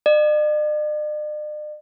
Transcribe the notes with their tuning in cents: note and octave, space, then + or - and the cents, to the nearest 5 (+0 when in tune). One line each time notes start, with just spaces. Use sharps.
D5 +45